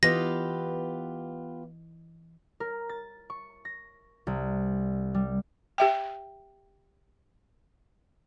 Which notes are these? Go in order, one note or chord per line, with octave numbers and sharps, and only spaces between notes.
E3 B3 F4 G4 D#5 A#6
A#4
A6
C#6
A#6
C2
G3
G4 E5 G5